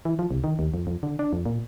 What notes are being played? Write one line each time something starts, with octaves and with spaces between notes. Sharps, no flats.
E3
F3
C2
D#3
D#2
F2
F2
D3
D4
F2
A#2